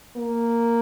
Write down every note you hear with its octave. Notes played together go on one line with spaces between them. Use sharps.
A#3